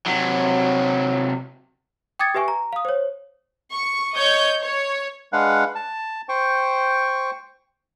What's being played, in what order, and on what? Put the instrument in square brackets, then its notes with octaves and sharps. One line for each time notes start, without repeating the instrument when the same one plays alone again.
[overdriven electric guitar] C3 F#3
[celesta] G5 D6 D#6 G#6 A6 C#7
G4 B4 E5 G#5 C#6
A#5
F5 D#6
C5 C#5
[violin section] C#6
C#5 D#5 G6
C#5
[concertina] G#3 D4 B4 F5 F#5
A5
C5 G5 C#6